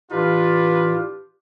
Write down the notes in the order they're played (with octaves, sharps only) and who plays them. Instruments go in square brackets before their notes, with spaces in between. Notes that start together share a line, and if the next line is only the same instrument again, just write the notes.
[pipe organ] A2 E3 [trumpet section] D4 F4 [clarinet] G4 [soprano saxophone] B4